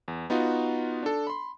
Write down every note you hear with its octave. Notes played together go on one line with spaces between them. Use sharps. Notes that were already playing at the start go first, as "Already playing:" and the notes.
E2
B3 D#4 F4 F#4
D4 A4
B5 C6